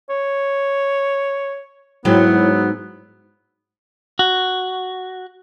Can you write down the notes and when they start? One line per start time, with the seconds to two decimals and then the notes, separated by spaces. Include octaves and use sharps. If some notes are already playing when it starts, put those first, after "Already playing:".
0.10 C#5
2.05 G#2 F#3 B3 E4
4.19 F#4